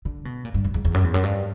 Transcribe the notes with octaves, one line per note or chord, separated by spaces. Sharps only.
D3
B2
A#2
G2
F#2
E2
E2
F#2
E2
F#2
G2